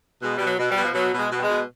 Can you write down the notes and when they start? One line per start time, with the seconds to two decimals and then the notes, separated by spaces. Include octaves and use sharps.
0.22 B2 G#3
0.37 B2 G3
0.46 F#3
0.59 B2
0.71 G3
0.77 B2
0.84 F3
0.94 B2 F#3
1.13 B2
1.19 G#3
1.31 B2
1.38 G3
1.43 G#3
1.49 B2